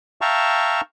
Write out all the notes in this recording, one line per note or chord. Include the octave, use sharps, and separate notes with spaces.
E5 F5 G5 A5 A#5 C#6